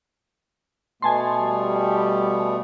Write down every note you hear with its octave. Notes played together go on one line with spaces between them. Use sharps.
B2 A3 B3 G#5 A5 C6
G3